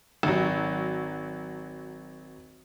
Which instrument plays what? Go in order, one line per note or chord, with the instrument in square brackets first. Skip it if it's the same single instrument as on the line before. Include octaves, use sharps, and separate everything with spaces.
[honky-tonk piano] G#1 F#3